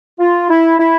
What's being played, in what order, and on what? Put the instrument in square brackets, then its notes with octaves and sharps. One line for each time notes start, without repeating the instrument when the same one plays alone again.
[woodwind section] F4
E4
E4